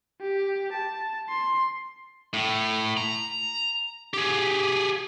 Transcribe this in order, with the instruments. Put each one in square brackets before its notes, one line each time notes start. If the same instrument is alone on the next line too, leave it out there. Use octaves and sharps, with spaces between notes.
[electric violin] G4
A5
C6
[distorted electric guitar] A2
A#5
G4 G#4